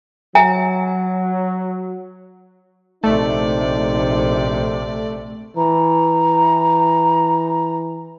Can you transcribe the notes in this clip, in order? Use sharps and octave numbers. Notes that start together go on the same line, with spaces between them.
F#3 E5 G#5 A#5
A#1 C3 A3 D#4 D5
E3 A#5